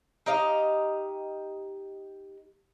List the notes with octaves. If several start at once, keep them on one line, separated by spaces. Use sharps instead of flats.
D#4 G4 D#5 F5